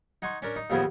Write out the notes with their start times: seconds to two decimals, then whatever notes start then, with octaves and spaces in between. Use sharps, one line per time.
0.22 D#4 F#5 G#5 C6 C#6
0.42 C#4 D4 A#4
0.56 D#4
0.70 D#2 C#3 F3 B3 C4 G#5